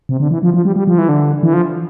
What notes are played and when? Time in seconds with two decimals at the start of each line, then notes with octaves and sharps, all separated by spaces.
0.09 C3
0.20 D3
0.31 E3
0.43 F3
0.54 F3
0.65 G3
0.76 G3
0.87 F3
0.98 E3
1.09 D3
1.43 E3
1.54 F3